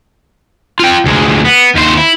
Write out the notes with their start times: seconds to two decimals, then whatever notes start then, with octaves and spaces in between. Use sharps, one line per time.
0.80 F4 G5
1.06 D2 G#3
1.45 B3
1.75 D#2 C5
1.97 E4